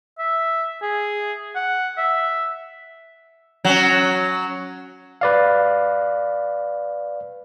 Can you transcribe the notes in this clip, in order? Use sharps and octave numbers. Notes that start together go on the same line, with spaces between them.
E5
G#4
F#5
E5
F#3 C#4
B4 D5 F5